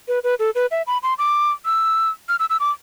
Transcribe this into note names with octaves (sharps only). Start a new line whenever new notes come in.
B4
B4
A4
B4
E5
B5
C6
D6
E6
F6
E6
E6
D6